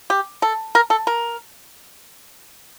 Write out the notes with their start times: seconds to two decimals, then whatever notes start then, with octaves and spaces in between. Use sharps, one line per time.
0.10 G4
0.42 A4
0.75 A#4
0.90 A4
1.07 A#4